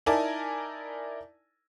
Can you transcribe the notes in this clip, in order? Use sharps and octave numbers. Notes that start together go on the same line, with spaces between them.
D#4 E4 A#4 D5 G#5 A5